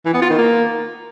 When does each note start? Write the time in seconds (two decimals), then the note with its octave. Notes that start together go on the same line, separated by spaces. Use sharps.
0.06 E3
0.14 B3
0.22 F4
0.30 D#3
0.38 A#3